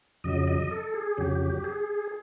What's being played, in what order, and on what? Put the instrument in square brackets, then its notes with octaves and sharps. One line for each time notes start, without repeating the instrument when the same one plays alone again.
[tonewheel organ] F2 C#3 F#3 D#5
D#5
A4
G#4
F2 C#3 F#3 G4
G#4